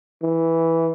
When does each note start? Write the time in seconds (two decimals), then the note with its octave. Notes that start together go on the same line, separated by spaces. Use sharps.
0.22 E3